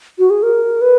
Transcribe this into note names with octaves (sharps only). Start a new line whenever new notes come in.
F#4
G#4
A#4
B4